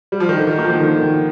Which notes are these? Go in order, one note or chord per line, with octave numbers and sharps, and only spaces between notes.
G3
F3
D#3
D3 D#4
D#3
D#3 A#3
F3
D#3
D3 D#3
D#3